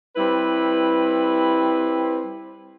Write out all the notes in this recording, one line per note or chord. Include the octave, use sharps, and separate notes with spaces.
G3 C4 E4 B4